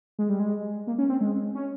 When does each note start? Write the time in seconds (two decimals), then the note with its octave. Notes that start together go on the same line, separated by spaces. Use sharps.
0.19 G#3
0.30 G3
0.40 G#3
0.87 A#3
0.98 C#4
1.10 C4
1.21 G#3
1.55 C#4